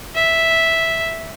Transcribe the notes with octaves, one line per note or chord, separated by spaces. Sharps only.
E5